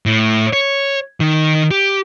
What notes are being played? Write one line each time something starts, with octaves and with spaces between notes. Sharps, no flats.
A2
C#5
D#3
G4